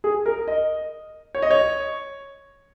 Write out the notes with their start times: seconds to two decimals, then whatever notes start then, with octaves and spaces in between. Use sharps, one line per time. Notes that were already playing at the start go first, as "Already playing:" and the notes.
0.04 G#4
0.26 A#4
0.48 D#5
1.35 C#5
1.42 D#5
1.51 C#5